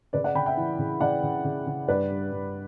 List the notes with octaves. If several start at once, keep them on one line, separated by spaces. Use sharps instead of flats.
C#3 B4 D5
D5 F#5
C#3 G5 B5
E5 G5
E3
C#3
C#3 D5 F#5
C#3
C#3
C#3
G2 B4 D5
G2
G2